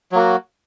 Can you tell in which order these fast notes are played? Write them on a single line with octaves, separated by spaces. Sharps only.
F#3 A#3 F#4